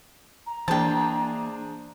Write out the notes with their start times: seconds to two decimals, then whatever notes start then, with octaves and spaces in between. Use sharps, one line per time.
0.46 A#5
0.68 E3 A#3 D4 G#4 C5 G5 A5